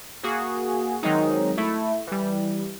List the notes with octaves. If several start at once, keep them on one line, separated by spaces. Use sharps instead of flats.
A#3 F#4 G#4
D#3 F#3 G#3 C4 D#4
A3 E4
E3 G3